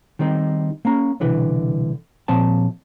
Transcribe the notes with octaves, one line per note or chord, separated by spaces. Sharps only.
D#3 G3 C4 D#4
A#3 C#4 A#5
C2 B2 D3 E3 B4
A#2 F3 C4 A5